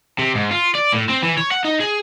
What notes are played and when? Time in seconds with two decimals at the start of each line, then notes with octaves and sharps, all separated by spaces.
0.19 C3
0.35 G#2
0.51 F4
0.75 D5
0.93 A2
1.09 C4
1.23 E3
1.37 C#5
1.52 F#5
1.65 D#4
1.80 G#4